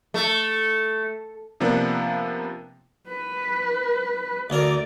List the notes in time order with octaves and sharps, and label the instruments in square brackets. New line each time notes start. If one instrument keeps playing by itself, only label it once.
[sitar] A3
[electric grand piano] C3 F3 A#3 B3 D4
[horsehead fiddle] B4
[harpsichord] D2 A#4 [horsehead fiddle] D5